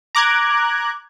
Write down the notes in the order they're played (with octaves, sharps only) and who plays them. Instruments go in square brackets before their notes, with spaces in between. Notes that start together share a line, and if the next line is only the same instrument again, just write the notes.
[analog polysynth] A#5 D6 F#6 G#6